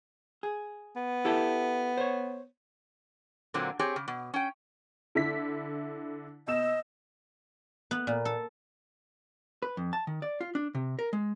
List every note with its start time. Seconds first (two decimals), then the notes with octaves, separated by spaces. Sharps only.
0.43 G#4
0.96 B3
1.25 E4 G4 A4
1.97 C5 C#5
3.54 A#2 D3 F#3 A#3 C4
3.79 C4 G4 G#4 C#5
3.96 C#3
4.08 B2
4.34 C#4 G5
5.15 D3 E4 B6
6.47 B2 D#5 E6 E7
7.91 B3
8.07 A#2
8.25 A4
9.63 B4
9.77 F2
9.93 A5
10.07 D#3
10.22 D5
10.41 F4
10.55 D4
10.75 C3
10.99 A#4
11.13 G#3